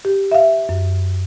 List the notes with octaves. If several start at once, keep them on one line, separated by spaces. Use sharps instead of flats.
G4
E5 F5
F#2